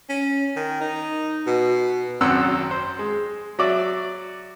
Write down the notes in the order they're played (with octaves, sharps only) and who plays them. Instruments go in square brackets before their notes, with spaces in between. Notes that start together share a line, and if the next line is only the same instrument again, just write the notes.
[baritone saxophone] C#4
D#3
D#4
B2
[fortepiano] G#1 F#2 C4 F#5 E6
C5
G#3
F#3 F#4 D5 E5